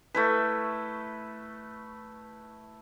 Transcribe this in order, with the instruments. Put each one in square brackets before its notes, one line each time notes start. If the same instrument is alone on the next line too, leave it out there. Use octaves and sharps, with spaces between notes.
[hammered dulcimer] A3 E4 B4